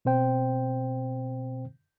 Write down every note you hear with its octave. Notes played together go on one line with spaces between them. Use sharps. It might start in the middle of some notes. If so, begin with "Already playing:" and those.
B2 C4 C5 G5